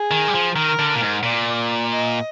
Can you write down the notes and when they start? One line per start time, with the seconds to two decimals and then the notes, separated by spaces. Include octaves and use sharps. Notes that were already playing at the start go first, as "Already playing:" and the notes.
Already playing: G#4
0.11 D#3
0.28 G3
0.34 F3
0.56 D#3 A#4
0.79 D3
0.95 A#2
1.02 G#2
1.23 A#2 D5
1.91 D#5